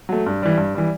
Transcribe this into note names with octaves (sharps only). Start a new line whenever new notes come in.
F#3 A3
G2
E3 G3
G2
E3 G3